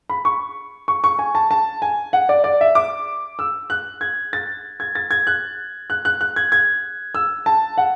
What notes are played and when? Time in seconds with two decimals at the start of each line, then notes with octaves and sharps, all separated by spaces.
0.10 B5
0.25 C#6
0.88 C#6
1.04 C#6
1.19 G#5
1.35 A5
1.51 A5
1.82 G#5
2.13 F#5
2.29 D5
2.44 D5
2.61 E5
2.75 D6
3.39 E6
3.70 F#6
4.01 G#6
4.33 A6
4.80 G#6
4.95 A6
5.11 G#6
5.27 F#6
5.90 F#6
6.05 F#6
6.21 F#6
6.36 G#6
6.52 G#6
7.15 E6
7.46 A5
7.78 F#5